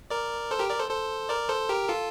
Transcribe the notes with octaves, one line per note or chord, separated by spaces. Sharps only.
A#4 D5
A4 C5
G4 A#4
A#4 D5
A4 C5
A4 C5
A#4 D5
A4 C5
G4 A#4
F4 A4